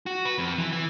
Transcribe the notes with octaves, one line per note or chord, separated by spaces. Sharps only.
F#4
B4
F2
E3
E3